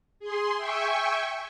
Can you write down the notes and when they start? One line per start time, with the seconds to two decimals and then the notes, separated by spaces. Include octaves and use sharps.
0.20 G#4 C6
0.57 E5 G5 G#5 C#6